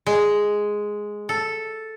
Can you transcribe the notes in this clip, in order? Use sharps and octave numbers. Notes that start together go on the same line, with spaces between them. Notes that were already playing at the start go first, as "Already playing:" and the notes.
G#3
A4